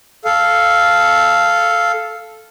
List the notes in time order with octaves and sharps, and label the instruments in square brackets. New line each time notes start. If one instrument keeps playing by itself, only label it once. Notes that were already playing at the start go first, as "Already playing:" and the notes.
[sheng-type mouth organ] A4 F5